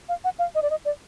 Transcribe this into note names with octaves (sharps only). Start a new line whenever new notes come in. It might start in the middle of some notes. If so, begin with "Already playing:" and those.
F5
F#5
F5
D#5
D5
D#5
D5